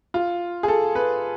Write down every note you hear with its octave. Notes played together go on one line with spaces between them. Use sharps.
F4
G#4
A4
B4